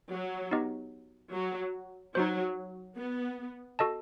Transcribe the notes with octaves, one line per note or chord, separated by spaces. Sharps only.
F#3
B3 D#4 G4 D#5
F#3
F#3 D#4 F#4 C5
B3
F#4 A4 D#5 A5